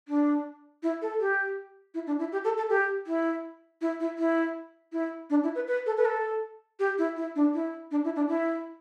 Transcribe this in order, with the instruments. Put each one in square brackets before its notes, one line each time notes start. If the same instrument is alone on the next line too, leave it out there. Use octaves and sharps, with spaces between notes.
[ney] D4
E4
A4
G4
E4
D4
E4
G4
A4
A4
G4
E4
E4
E4
E4
E4
D4
E4
B4
B4
A4
B4
A4
G4
E4
E4
D4
E4
D4
E4
D4
E4